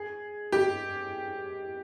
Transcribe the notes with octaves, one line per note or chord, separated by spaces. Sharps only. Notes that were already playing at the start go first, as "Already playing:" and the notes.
Already playing: G#4
G4